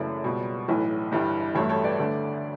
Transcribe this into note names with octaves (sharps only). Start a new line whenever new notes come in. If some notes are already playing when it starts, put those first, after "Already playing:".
Already playing: F#1 F#2 C#3 E3 A3 B4 D5
C#2 B2 G3
B1 A2 E3
G1 G2 E3 G3
A1 G2 F#3 A3 A4 C#5
A4 C#5
B4 D5
D2 D3 A3